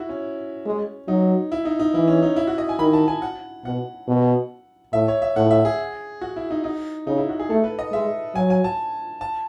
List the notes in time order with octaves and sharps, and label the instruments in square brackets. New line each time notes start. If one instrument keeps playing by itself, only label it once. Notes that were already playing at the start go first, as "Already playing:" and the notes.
Already playing: [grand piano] E4 F#4
C#4
[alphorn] G#3
[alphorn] F#3 [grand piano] D#4
[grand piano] E4
D#4
D#4
[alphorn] E3 [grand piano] E4
[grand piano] C#4
D#4
E4
F#4
D#5
G#5
[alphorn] D#3 [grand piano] B5
[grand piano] A5
G#5
F#5
[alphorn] B2 [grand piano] F#5
[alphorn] B2
[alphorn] A2 [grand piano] E5
[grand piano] C#5
E5
[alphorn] A2 [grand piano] F#5
[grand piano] E5
G#4
F#4
E4
D#4
D#4
[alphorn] C#3 [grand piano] D#4
[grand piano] E4
F#4
G#4
[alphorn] A3 [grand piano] A4
[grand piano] B4
D#5
[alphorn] G#3 [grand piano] E5
[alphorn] F#3 [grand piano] G#5
[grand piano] G#5
A5
A5